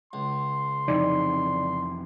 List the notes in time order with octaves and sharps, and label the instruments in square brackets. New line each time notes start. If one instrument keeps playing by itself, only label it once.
[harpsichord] C#2 [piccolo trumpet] C6
[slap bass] F2 C3 E3 [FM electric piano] D#4 D5